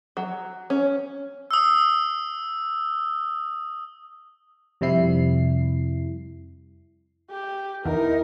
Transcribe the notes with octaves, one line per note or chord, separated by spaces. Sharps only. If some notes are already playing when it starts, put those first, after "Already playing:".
F#3
C#4
D#6 E6
F2 C3 G3 E4 C7
G4
E2 D#4 E4 A#4